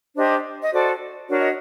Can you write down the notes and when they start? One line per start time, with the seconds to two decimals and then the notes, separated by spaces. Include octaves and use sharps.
0.15 D4 G4 C5 D#5
0.61 D#5
0.72 F#4 A4 C5 D5
1.29 D4 F#4 A#4 C#5 D5
1.39 D#5